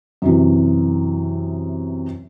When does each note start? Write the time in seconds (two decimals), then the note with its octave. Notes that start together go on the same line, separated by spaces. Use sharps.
0.22 F#2 C3 E3